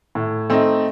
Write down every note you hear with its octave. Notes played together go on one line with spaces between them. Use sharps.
A2
A3 C4 D#4